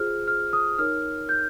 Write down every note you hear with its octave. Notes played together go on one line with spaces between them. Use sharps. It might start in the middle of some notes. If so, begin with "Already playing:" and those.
Already playing: F4 G#4 C5 F6
F6
D#6
D#4 A#4 C#5 F6
G6